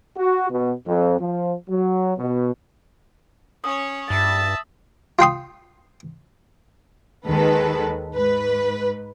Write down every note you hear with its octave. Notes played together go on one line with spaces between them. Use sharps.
F#4
B2
F2
F3
F#3
B2
C#4 C#5 D#6
G2 E5 A5 A6
F4 G5 C6 D#6
D#2 D#3 G#3 A4 B4
G#2 B4